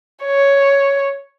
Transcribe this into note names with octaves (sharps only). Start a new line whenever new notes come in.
C#5